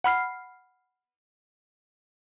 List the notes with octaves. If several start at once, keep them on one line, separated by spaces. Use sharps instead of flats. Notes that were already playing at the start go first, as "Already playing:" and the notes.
F#5 B5 F6 C7